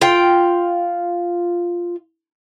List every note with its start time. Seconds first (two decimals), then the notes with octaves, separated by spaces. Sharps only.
0.01 F4 G5